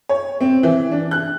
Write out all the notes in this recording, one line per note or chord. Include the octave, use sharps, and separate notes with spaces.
C#5
C4
E3
D4
F#6